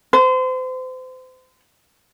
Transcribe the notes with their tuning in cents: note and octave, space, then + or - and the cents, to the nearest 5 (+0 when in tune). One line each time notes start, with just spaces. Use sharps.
C5 -35